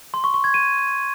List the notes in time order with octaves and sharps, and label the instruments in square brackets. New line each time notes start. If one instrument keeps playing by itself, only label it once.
[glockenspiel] C6
C#6
C#6
G#6
D#7